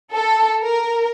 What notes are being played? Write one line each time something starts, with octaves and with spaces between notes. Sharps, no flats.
A4
A#4